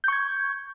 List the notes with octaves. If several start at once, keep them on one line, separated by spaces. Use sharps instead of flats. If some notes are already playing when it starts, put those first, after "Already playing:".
C#6 G6 G#6